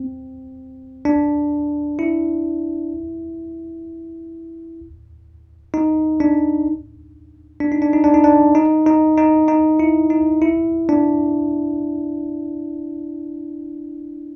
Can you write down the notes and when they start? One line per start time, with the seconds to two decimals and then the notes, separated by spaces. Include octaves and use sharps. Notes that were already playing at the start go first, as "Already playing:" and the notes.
Already playing: C4
1.05 D4
1.99 E4
5.74 D#4
6.20 D4
7.60 D4
7.72 D#4
7.82 D4
7.93 D#4
8.04 D4
8.14 D#4
8.24 D4
8.55 D#4
8.86 D#4
9.18 D#4
9.48 D#4
9.79 E4
10.10 D#4
10.42 E4
10.89 D4